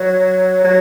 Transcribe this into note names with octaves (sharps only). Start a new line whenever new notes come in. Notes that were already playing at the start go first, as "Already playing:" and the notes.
Already playing: F#3
F#3